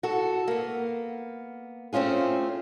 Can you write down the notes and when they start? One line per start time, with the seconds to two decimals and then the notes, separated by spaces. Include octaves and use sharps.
0.03 F#4 A4
0.48 A#3 B3
1.93 A3 C4 C#4 F4 G#4